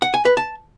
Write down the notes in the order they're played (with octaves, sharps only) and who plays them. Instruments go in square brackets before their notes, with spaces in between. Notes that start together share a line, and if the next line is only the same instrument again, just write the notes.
[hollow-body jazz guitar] F#5
G#5
B4
A5